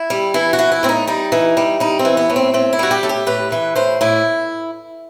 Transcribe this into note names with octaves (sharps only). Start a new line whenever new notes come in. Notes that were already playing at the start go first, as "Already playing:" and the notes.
Already playing: E4
G3
E3 E4
F#4
E3
E4
A2 C4
D#4
G3 D#4
E3
G3
G3 D#4
C4
E3
B3
A2
C4
A2 C4
E4
G3 F#4
G4
A2 A4
G4
A2 B4
E3 B4
A2 C5
A2 E4